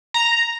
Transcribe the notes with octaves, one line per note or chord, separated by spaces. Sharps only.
A#5